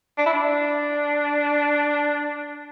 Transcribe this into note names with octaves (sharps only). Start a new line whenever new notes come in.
D4
E4
D4